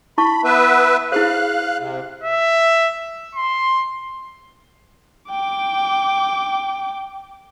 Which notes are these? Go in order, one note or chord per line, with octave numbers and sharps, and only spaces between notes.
E4 A5 B5 C#6
B3 B4 E5
E4 G#4 C5 F5 F#6
C3
E5
C6
G5 D6